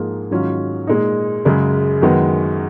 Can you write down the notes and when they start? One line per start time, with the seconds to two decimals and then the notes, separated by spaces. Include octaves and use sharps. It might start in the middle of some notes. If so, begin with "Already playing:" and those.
Already playing: G#2 F3 A#3 F4 G#4
0.31 G#2 D#3 F#3 C#4 F4
0.87 A#2 G#3 D#4
1.45 F#2 C#3 G#3
2.02 F#2 D#3 G#3 B3 F#4